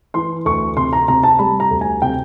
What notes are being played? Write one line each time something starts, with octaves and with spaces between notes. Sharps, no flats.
E3 C6
D2 C#6
C3 C6
A#5
C3 A#5
A5
G3 B5
A#5
D2
G#5
C3 G5